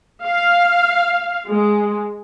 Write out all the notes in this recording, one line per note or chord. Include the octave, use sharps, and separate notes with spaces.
F5
G#3